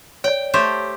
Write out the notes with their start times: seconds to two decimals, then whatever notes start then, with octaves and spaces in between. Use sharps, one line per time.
0.24 C#5 D5 G5
0.54 A3 G4 C5 C#5